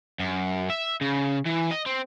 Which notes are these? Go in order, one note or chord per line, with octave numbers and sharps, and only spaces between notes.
F#2
E5
C#3
E3
D#5
C4